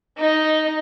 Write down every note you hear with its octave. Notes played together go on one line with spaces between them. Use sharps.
D#4